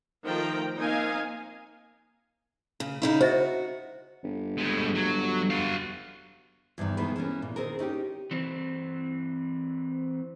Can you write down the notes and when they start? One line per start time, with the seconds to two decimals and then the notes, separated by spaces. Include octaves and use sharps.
0.24 D#3 F3 A3 G5 A#5
0.77 A#3 C4 D#4 D#5 F5 G#5
2.80 C#3
3.02 C#3 D#4 E4
3.21 F#4 C5 D#5 E5
4.23 G1
4.58 A2 G#3
4.96 F#3
5.50 F#4 F5
6.78 E2 G2 C3 D#3
6.97 B2 D#3 E3 G#3 A3 B3
7.16 E3 B3 C#4 A#4
7.42 A#2
7.56 D#3 C4 G#4 A#4
7.79 C#4 D#4 F#4 G4
8.31 E3 C4